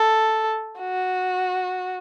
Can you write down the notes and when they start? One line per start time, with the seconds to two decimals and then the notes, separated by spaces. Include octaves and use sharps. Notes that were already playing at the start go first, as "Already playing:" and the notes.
Already playing: A4
0.79 F#4